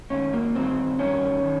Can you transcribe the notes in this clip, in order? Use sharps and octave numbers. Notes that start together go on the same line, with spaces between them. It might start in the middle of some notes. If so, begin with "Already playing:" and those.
G#2 D#3 C#4
A#3
G2 D#3 C4
G2 D#3 C#4
D#3